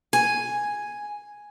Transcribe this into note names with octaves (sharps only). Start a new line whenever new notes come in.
G#5